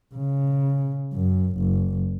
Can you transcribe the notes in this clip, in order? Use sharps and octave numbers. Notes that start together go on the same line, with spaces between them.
C#3
F#2
F#1